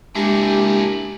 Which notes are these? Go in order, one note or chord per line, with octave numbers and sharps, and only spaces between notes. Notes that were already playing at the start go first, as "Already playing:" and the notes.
G#3 A#3 D4 E4 G4